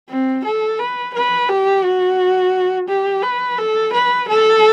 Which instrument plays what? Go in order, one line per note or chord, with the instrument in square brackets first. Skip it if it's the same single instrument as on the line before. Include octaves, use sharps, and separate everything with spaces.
[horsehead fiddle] C4
A4
B4
B4
G4
F#4
G4
B4
A4
B4
A4